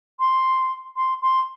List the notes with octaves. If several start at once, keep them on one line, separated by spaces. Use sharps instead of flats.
C6
C6
C6